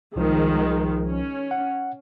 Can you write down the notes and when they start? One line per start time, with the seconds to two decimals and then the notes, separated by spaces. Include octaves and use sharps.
0.16 C2 D#3 F3 G#3
1.08 C#4
1.51 F#5